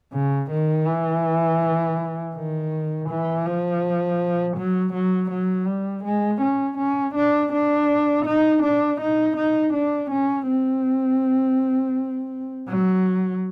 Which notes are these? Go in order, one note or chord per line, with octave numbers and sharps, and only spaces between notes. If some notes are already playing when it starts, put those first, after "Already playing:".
C#3
D#3
E3
D#3
E3
F3
F#3
F#3
F#3
G3
G#3
C#4
C#4
D4
D4
D#4
D4
D#4
D#4
D4
C#4
C4
F#3